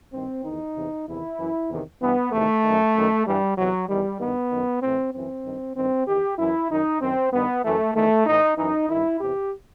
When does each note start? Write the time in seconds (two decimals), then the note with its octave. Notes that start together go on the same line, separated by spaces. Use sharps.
0.13 G2 D#3 C4
0.44 E2 D#3 D#4
0.76 E2 C3 E3
1.07 E2 C3 D#3 E4
1.38 F#2 E3
1.69 E2 C3 D#3
2.01 G2 E3 B3
2.32 E2 C3 D#3 A3
2.64 F#2 D#3
2.95 F#2 D#3
3.26 G2 E3 G3
3.57 E2 C3 E3 F#3
3.88 E2 D#3 G3
4.19 G2 D#3 B3
4.51 F#2 D#3
4.83 A2 E3 C4
5.13 F#2 E3 C4
5.45 G2 D#3
5.76 G2 D#3 C4
6.07 E2 D#3 G4
6.39 F#2 E3 E4
6.69 F#2 D#3 D#4
7.01 F#2 D#3 C4
7.32 G2 D#3 B3
7.64 F#2 E3 A3
7.95 E2 D#3 A3
8.27 A2 E3 D#4
8.57 F#2 E3 D#4
8.89 G2 D#3 E4
9.20 E2 C3 E3 G4